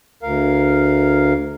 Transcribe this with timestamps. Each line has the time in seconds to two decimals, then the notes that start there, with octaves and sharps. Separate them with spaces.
0.23 D2 A#4 F5